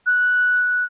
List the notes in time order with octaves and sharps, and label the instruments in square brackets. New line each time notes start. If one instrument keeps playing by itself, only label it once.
[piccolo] F#6